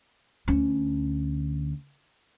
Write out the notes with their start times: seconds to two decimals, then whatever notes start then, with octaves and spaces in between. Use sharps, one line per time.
0.48 D2 C#4